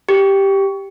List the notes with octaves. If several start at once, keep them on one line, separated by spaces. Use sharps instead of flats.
G4